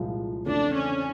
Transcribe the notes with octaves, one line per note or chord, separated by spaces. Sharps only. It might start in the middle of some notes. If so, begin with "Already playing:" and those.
Already playing: C2 A#2 F3 G#3
E2 C#3 E3 A3 C4 D4
C#4